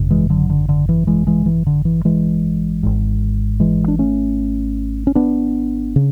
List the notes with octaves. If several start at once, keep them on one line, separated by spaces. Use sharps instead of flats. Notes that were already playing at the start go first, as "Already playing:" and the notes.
Already playing: G#1 F#2 C#3
E3 G#3
D3 F#3
D3
D3
E3
E3 G#3
E3 G#3
E3
D3
E3
E3 G#3
G#1 G#2
E3 G#3
D4
A3 C#4
C#4
B3 D4
C#3